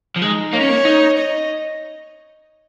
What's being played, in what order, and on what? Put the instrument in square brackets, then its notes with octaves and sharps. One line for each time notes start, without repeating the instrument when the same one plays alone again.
[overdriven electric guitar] F3
[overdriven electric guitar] G#3 [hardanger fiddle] D#4
[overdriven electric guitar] A#3 [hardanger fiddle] C#5
[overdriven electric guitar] C#4
A#3
D#4
[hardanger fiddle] D#5